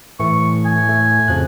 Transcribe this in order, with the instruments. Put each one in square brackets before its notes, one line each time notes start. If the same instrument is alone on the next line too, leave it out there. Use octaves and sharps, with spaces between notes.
[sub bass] A2 [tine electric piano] E3 A3 [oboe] C#6
[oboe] G#5
[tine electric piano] A3
[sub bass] F2 [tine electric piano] C#3 F3 F#6